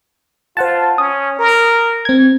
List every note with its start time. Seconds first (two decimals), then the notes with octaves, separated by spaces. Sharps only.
0.57 F4 C5 F#5 A5
0.98 C#4 D#6
1.39 A#4
2.05 C4 G#6